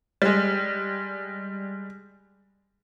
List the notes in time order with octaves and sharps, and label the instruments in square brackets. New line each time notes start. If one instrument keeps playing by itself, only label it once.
[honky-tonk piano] G3 G#3